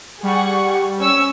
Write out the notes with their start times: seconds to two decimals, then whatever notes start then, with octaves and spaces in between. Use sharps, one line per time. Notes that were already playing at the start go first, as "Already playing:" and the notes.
0.23 G3 G#4 F#5 C#6
0.99 C#4 C#6 E6